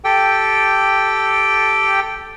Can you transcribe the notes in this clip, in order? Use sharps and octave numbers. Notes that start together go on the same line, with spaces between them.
G4 A4 G5